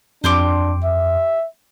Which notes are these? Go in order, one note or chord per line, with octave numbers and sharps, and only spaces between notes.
F2 D4 G4 C6 D6
E5